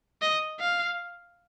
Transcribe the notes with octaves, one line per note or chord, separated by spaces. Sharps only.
D#5
F5